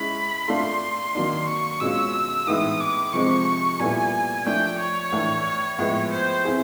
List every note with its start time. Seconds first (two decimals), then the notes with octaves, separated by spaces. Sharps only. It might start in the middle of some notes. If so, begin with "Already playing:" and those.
Already playing: G#3 C#4 E4 B5
0.48 A3 D4 F4 A4 C6
1.15 D#3 F#3 A#3 D4
1.47 C#6
1.80 B2 G#3 C#4 F4 E6
2.47 A2 E3 G#3 B3 D#4 D#6
2.80 D6
3.13 C3 F3 G#3 C4 C#6
3.79 A#2 G3 B3 E4 A4 G#5
4.46 F3 A3 D4 G5
4.78 C#5
5.12 A2 E3 A3 D4
5.79 A2 F3 G#3 B3 C#5
6.11 C5
6.45 C4 E4 G#4